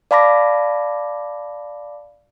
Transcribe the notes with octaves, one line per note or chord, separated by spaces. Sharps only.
D5 F5 A5 B5 D6 A#6